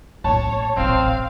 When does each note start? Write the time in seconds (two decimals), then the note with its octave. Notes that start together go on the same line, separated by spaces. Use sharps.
0.24 A1 A#3 C#5 A5
0.77 D#1 A1 C4 F5